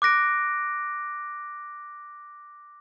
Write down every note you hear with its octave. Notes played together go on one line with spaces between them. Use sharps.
D6 F#6 A#6 D7